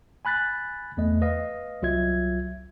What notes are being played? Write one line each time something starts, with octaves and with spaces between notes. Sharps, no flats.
G#5 B5 F#6 A6 B6
E2 A3 D#5
B4 D#5 F5
C2 F#3 F4 E5 G#6